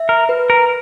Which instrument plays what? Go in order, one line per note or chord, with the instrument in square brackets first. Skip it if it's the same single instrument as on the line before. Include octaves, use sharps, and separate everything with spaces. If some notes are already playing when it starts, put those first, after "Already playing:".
Already playing: [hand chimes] E5
[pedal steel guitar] A#4
[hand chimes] B4
[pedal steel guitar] A#4